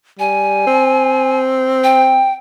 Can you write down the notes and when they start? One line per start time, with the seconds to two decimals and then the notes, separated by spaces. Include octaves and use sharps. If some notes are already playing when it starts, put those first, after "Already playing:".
0.19 G3 G#5
0.67 C4
1.84 G5